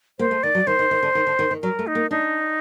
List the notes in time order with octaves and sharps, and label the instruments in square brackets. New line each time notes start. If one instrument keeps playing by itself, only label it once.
[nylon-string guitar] A#3 [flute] C5
[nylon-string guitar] A3
[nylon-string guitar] D#3 [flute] D5
[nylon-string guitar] F#3
[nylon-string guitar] D#3 [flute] C5
[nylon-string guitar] D#3
D#3
D3
D#3
D3
D#3
D#3
[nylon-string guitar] F#3 [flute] A#4
[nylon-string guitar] A3
[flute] D#4
[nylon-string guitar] A#3
[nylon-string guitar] D4 [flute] D#4